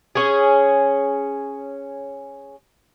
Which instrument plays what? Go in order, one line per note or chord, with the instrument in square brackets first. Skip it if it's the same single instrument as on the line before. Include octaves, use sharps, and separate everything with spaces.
[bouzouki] C#4 G#4